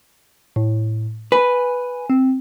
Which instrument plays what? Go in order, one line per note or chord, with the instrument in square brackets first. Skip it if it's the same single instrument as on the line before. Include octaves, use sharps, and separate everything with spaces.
[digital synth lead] A2
[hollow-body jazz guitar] B4 [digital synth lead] G#5
[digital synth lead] C4